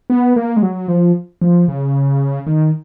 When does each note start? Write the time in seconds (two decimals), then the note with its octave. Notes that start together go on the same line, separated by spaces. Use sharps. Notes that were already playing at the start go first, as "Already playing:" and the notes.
0.10 B3
0.36 A#3
0.57 G#3
0.62 F#3
0.88 F3
1.42 F3
1.68 C#3
2.47 D#3